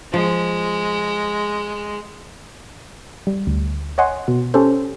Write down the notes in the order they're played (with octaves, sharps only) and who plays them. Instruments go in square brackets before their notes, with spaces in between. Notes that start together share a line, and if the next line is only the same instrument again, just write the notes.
[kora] F3 [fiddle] G#3
[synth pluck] G3
D2
C#5 D#5 F#5 G#5 C6
B2
C#4 G4 A4 C5